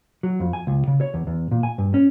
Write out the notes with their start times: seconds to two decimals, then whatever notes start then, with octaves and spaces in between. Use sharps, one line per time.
0.23 F#3
0.40 F2
0.53 G#5
0.67 C#2
0.87 C#3
1.01 C#5
1.14 E2
1.27 E2
1.51 A#2
1.63 G#5
1.78 G2
1.94 C#4